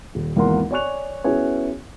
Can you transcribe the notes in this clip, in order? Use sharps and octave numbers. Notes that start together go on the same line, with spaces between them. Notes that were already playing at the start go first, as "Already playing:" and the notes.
D#1
G#1 E2 A#3 A#4 F#5 C6
C#5 D5 G#5 C#6 F#6 F7
B3 C#4 E4 F#4 G#4 C#5